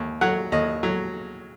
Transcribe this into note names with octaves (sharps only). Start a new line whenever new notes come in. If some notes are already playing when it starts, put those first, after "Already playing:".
Already playing: D#2
F#3 F#5
D#2 D#5
F#3